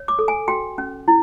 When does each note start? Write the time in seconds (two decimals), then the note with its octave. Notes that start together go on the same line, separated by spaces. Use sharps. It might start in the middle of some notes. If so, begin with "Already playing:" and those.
Already playing: C#5
0.08 D6
0.19 A4
0.28 G#5
0.48 F#4 G5
0.78 C#4
1.08 E4